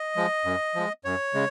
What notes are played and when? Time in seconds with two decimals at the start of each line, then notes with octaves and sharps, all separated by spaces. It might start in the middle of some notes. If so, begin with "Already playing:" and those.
Already playing: D#5
0.16 F3 G#3
0.45 F#2
0.75 F3 G#3
1.05 F#2 C#5
1.34 C#3 G#3